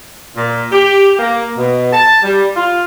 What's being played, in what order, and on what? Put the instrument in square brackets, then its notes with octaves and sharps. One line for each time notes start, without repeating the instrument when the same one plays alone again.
[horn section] A#2
G4
A#3
B2
A5
G3
F4